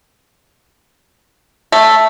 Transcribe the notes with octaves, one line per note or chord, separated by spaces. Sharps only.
A3